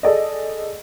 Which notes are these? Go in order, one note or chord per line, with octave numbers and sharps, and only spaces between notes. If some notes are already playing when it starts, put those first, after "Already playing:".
G#4 A4 D5 D#5